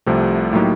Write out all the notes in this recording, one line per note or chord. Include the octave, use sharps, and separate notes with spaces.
C2 C3 F3 A3
A2 F#3 A#3 D#4 G4